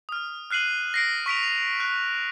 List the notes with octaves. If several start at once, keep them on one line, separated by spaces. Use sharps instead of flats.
D#6 F6
F6 F#6 C7 D#7 F#7
A#6 C7 D7
C#6 B6 D7 F7
F7
F#6